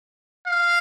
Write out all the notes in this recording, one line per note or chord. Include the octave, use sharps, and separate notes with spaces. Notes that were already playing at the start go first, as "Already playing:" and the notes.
F5